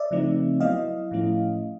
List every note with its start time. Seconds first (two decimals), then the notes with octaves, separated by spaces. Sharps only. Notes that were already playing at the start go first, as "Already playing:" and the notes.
Already playing: D5 E5
0.11 C#3 F3 A3 C4 D#4
0.60 F#3 B3 E4 D#5 F5
1.11 A2 F3 A3 C#4 E4